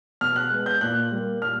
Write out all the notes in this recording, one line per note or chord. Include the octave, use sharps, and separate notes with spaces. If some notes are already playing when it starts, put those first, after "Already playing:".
B2 F6
F#6
G#3 B3
G6
A#2 F#6
G3 A#3
A#2 F6